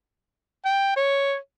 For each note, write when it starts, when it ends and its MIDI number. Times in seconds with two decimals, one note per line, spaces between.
0.65 0.93 79
0.96 1.35 73